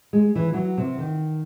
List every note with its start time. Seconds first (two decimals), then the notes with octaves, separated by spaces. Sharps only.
0.13 G#3
0.35 E3
0.54 F#3
0.78 C3
0.98 D#3